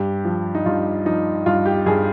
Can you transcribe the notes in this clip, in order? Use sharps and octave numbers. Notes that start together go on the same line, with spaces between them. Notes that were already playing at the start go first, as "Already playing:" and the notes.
Already playing: G2 G4
F3
D#4
G2 F4
F3 D#4
G2 F4
G4
G2 G#4